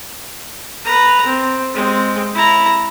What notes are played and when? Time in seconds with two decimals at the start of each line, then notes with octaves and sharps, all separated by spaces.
0.85 B4 A#5
1.26 C4
1.74 G#3 C4
2.35 E4 A#5